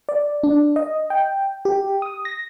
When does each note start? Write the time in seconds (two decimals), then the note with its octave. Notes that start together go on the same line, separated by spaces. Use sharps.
0.09 D5
0.43 D4
0.76 D#5
1.10 G5
1.65 G4
2.02 D#6
2.25 A#6